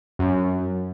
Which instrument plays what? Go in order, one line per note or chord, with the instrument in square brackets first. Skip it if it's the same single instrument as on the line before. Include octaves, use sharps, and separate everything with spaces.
[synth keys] F#2